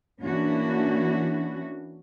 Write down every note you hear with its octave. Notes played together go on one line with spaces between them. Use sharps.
E3 A#3 C#4 D4 E4 F#4